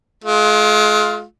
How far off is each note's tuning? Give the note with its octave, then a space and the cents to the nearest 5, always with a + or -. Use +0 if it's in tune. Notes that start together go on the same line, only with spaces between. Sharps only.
G#3 +40 F4 +5